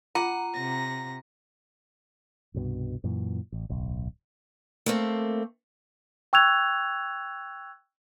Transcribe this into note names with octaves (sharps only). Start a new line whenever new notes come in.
F4 F#5 A#5 D6
C3 A#6
C2 G2 B2
F#2 A#2 E3
A1
D1 B1
A3 A#3 C4
G5 C#6 E6 F#6 G#6 F7